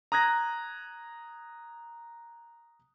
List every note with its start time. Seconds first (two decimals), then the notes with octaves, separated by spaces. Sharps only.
0.12 A#5 D#6 F#6 G#6 A#6